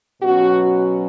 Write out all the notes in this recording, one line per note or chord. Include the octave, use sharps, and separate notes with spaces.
B2 F#3 C#4 F#4